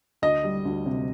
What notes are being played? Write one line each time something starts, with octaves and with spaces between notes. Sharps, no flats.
D2 D#5
G3
D2
C3